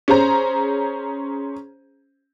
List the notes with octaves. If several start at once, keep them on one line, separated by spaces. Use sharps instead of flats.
C#4 G#4 C5 A#5